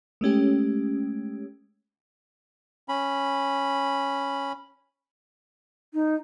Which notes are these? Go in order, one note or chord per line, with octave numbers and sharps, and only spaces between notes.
G#3 A3 C#4 G4
C#4 B5
D#4